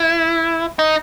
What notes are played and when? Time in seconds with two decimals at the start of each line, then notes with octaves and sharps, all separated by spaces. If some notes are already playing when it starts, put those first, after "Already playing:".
Already playing: E4
0.79 D#4